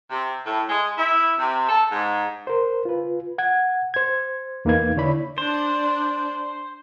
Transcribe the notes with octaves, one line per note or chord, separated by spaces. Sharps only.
C3
A2
G#3
E4
C3
A4
G#2
A#4 C5
F4 B4
F#5 G#6
C5 G#6
E2 A#3 D#4 B4 F5 G#6
D3 E4 C#5 D5 B5
D4 C5